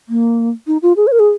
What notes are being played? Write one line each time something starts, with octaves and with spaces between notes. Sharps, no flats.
A#3
D#4
F4
G#4
C#5
A#4
G#4